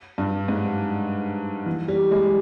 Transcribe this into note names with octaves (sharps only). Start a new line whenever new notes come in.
G2
G#2
E3
G3
G#3